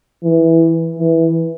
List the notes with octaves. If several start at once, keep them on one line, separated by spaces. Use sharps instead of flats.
E3
E3